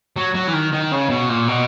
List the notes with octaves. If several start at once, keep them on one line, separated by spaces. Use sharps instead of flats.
F#3
F#3
E3
D#3
D#3
C#3
B2
A#2
B2